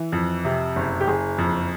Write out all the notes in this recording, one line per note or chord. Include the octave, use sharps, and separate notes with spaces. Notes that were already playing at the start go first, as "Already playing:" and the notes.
Already playing: E3
F2
C3
F#1
G4
F#1 G#4
F2